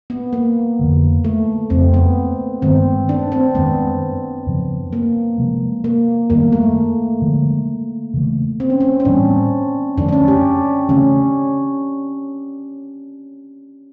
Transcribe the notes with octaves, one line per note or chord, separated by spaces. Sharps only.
B3
A#3
F2 D3 F3
A3
F2 C#3 F3 A#3 C4
B3
G2 D#3 G#3 B3 C4
D4
C4
F#2 D#3 G#3 B3
F#2 C#3 F3
A#3
C3 F3 G#3
A#3
F#2 D#3 G3 A#3 B3
A3
D3 F3 G#3
C#3 E3 A3
C4
C#4
C4
C#4
A2 E3 G3 B3 D4
F#2 D3 F3 A3 D4
D4
C#4
G4
C#3 E3 A3 C4 C#4